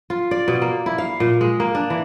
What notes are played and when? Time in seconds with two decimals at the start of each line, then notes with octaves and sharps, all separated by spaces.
0.10 F4
0.31 D5
0.48 B2
0.62 A#3
0.86 E4
0.98 F5
1.20 A#2
1.41 G#3
1.60 A#3
1.75 D4
1.90 E3